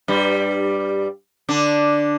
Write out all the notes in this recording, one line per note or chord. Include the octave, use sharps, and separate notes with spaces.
G2 G3
D3 D4